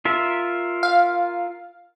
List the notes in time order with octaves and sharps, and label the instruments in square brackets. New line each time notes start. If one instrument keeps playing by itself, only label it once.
[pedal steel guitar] F4 A#4 E5
[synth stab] F5